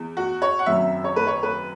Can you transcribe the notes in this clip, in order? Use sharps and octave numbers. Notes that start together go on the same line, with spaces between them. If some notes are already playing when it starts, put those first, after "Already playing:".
Already playing: E2
F#4
C#5
F#5
G#1 F#2 F#3 E5
C#5
B4
C#5
B4